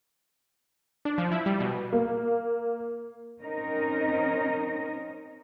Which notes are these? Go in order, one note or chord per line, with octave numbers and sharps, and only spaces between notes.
D4
F3
E4
G3
B2
A#3
C4 C#4 D#4 A#4 D#5